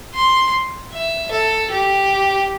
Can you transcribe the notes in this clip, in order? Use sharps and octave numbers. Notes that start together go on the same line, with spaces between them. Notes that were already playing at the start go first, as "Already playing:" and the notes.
C6
E5
A4
G4